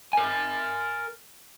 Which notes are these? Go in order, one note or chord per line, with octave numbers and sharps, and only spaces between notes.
A#4 G#5